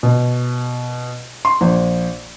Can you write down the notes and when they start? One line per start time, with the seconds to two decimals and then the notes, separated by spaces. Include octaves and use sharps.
0.03 B2
1.45 C6
1.61 A#1